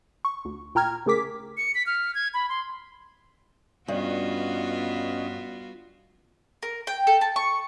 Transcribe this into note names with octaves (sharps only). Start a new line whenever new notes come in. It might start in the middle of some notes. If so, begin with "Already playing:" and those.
C#6
D2
A#2 G5 A#5 F6 G#6
C#3 A3 G#4 A#4 D6 B6
C#7
B6
F6
G#6
B5
C6
G2 B3 C#4 F4 F#4 D#5
A#4
G5
A4
A5
C#6